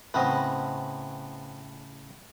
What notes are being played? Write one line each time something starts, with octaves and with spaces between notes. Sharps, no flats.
A2 C#3 B3 C4 D#5